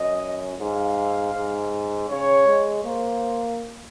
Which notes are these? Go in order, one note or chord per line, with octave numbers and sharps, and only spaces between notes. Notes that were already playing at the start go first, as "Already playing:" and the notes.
Already playing: F#2 D#5
G#2 F5
G#2
C#3 C#5
G#3
A#3 C5